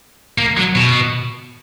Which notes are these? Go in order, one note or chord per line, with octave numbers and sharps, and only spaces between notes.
A#3
F#3
B2